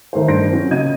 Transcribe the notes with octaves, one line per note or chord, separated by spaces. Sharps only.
D#3 A3 A#4 C5
G2 C5 C6 G6 A#6 D7
F#3 C4 C#4
A#2 C#3 D#5 G#6 D#7